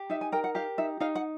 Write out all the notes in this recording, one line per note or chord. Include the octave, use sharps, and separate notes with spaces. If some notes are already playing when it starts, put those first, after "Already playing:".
Already playing: G4
D#4 E5
G#5
A#4 G5
F#5
G4 F5
D#4 E5
D#4 F5
F#5